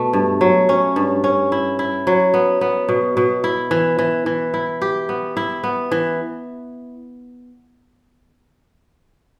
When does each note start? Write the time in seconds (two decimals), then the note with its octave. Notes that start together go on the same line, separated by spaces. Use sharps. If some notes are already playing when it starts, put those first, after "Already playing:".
Already playing: B2 A3
0.13 G2
0.41 F#3
0.69 C#4
0.96 G2
1.24 C#4
1.52 E4
1.79 E4
2.07 F#3
2.34 B3
2.61 B3
2.89 B2
3.17 B2
3.44 E4
3.71 E3
3.99 E3
4.26 E3
4.54 E4
4.82 G4
5.09 B3
5.37 E4
5.64 B3
5.91 E3